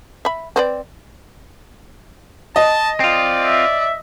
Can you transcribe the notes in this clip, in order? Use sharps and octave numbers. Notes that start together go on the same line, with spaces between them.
E5 B5
C4 B4 D5
D#5 A5
C4 F4 D5
E5